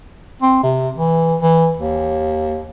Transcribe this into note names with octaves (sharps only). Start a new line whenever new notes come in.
C4
C3
E3
E3
D#2